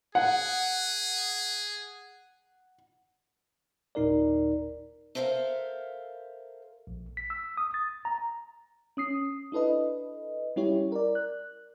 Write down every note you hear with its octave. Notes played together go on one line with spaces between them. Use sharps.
G#4 F#5
G1 D#2 A#2 D#4 A#4 D5
A4 A#4 C5 E5 F5
A#1
B6
E6
D#6
A6
A#5
C#4 D#6 C7
D4 E4 A4 B4 D#5
G3 C#4 E4 G4 C#5
A#4 D5
F#6